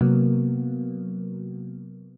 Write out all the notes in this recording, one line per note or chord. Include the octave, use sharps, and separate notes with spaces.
C3 F#3 A#3 B3